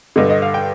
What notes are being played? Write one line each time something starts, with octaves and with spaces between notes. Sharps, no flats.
G2 D3 D#5
D#5
F5
G5